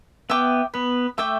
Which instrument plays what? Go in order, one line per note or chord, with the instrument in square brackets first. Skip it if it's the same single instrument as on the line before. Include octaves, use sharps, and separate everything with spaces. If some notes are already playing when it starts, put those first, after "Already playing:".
[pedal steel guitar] B3 [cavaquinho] E5 G5 D6
[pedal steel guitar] B3 [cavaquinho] B4
[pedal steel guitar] A3 [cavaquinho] E5 G5 D6